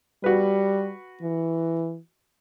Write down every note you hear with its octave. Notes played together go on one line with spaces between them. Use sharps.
G3 F#4 B4
E3